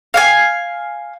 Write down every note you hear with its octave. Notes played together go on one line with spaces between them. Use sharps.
F5 F#5 G#5